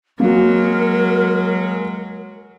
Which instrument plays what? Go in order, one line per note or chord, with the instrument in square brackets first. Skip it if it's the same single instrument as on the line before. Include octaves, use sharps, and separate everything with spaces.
[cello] F#3 G#3 [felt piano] A#3 F#4 [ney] A#4